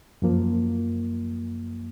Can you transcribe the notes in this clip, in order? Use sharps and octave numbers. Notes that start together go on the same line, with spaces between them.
F#2 F3 A#3